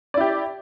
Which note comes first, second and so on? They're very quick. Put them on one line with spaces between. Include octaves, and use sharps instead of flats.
D5 E4 G4